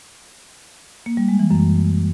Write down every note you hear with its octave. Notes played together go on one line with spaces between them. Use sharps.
A#3
G3
G#3
E3
F#2